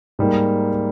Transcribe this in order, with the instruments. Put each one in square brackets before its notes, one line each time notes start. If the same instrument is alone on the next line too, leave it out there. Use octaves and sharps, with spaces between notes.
[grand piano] G#2 G3 A#3